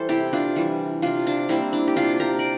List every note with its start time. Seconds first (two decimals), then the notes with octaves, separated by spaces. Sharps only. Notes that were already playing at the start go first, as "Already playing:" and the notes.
Already playing: E3 G3 A4 C5
0.09 C3 E4 G4
0.33 D4 F4
0.56 E3 G3
1.02 C3 D4 F4
1.27 D4
1.49 G3 A#3 C4 E4
1.73 D4
1.88 G4
1.96 C3 D4 F4
2.20 G4 A#4
2.39 D5